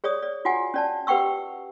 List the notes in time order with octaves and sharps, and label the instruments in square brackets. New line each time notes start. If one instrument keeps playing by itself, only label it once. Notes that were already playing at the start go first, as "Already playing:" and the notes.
[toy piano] G#4 C#5 D5 D#6
D5
F4 F#4 F#5 G#5
C#4 D5 A5
G4 B4 F#5 G5 C#6 E6